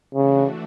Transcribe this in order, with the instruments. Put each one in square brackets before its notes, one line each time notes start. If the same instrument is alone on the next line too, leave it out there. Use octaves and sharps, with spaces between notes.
[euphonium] C#3 [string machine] E3 A3 D4 F#4